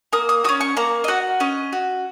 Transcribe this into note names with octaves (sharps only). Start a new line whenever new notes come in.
A#3 D#6
D#6
F#4 D#6
C#4
C#6
A#3 A#5
D#5
F#4 F#5
C#4 D#5
F#4